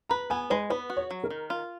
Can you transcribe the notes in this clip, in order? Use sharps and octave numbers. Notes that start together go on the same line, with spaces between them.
B4 A#5
B3 G#5
G#3 B4
B3 B4
F#4
C#5
F#3
A#4
D#3
F4